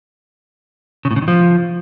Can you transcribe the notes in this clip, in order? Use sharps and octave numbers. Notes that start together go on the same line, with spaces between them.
C#3
A2
C#3
D#3
F3